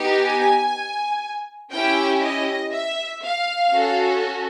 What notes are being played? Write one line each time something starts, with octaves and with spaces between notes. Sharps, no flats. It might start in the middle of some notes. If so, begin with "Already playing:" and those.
Already playing: B3 D#4 G4
G#5
C#4 E4 G4 G5
D#5
E5
F5
C#4 F#4 A4